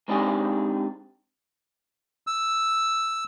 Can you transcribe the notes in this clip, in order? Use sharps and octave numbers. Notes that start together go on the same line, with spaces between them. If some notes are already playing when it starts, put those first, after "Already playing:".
G#3 C4 D4 D#4 G4 G#4
E6